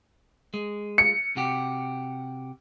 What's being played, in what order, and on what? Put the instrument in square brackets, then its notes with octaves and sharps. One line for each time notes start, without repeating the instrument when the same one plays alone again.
[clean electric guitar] G#3
[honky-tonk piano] C#7
[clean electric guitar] C3 F#4 G4